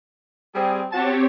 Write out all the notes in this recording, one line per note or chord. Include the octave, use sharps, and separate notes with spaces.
G3 C4 G#4
C4 F#4 G4 C#5 A5